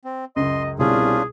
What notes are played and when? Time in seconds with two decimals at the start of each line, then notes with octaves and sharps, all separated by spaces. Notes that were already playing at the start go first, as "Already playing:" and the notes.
0.05 C4
0.36 C#2 F#2 D#5 C6
0.79 C2 B2 C#4 D4 F4 G#4